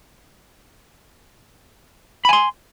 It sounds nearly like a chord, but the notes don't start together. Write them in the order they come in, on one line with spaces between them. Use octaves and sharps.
B5 G#5 C6